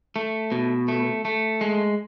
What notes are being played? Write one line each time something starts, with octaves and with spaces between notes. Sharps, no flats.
A3
B2
A3
A3
G#3